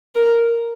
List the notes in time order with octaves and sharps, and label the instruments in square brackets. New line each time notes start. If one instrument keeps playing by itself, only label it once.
[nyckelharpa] A#4